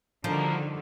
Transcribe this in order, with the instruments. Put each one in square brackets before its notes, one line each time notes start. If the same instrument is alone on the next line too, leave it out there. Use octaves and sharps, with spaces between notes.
[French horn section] B2 A#3 A#4 [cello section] D3 D#3 G3 [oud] F3